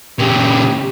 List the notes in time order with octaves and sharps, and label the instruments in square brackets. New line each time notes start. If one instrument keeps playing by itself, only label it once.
[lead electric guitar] A#2 C#3 [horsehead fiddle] G4